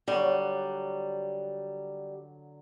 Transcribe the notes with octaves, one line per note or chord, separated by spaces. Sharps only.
D3 F#3 G3